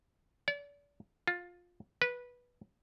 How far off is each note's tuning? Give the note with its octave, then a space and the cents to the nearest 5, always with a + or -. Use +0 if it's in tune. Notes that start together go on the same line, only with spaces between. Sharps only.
D5 -40
F4 +15
B4 -15